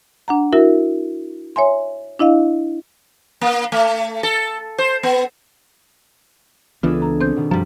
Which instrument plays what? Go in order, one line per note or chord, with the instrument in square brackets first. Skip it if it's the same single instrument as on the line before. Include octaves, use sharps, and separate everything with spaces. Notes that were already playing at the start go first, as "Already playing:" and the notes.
[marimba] D4 F#5 A#5
E4 F#4 A#4 E5
C#5 E5 G#5 C6
D4 E4 D#5 F5
[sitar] A#3
A3
A4
C5
B3
[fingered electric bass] C#2 E3 B3 [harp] D4 G#4 A4 [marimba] F4
[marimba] A#5
C4 C5 G6
[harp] B2 D#3
[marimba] F#2 [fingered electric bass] F3 G3